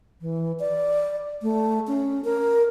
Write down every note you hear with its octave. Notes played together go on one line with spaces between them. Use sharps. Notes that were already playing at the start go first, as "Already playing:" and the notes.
E3
D5
A3
C#4
A#4